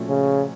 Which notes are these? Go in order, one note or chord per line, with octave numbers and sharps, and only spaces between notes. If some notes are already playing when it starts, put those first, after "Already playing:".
Already playing: A#2 F3 A3 C#4 F#4
C#3